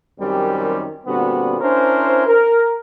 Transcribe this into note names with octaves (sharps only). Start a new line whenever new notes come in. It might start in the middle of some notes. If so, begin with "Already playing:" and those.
F#2 D#3 G3 C4 G4 A#4
A#2 D3 G3 B3 C4 F#4
C#4 D4 E4 A#4 C5
A#4